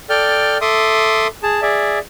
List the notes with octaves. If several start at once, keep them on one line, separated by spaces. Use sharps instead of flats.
A4 D5 G5 F6
A4 E5 C6 D6 D#6
G#4 A5
G#4 D5 E5